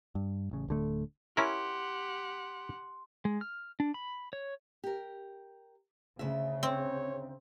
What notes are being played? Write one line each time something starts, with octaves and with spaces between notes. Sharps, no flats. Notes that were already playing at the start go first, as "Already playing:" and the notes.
G2
A1 C#3
D1 D3 A3
C#4 E4 G4 A#4 F#5 C6
G#3
F6
D4
B5
C#5
G4 A#4
D2 C#3 E5
C4 C#5